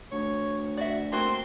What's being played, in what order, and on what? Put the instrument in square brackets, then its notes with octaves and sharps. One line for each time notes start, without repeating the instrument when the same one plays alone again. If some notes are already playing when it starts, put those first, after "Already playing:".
[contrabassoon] D2 [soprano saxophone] C#5
[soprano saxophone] F#4 [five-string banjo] D5 E5
[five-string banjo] A3 A#3 F#4 [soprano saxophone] C4 [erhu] C6